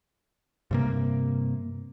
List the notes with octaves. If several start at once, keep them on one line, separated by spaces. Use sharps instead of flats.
G2 C3 A#3